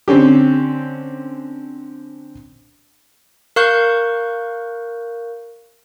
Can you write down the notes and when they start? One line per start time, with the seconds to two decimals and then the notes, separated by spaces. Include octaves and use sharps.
0.08 D3 C4 C#4 G4
3.56 A#4 F5 C#6 F#6 G6